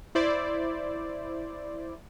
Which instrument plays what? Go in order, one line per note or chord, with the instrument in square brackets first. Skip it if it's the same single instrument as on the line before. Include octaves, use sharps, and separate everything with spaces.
[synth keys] E4 C5 D5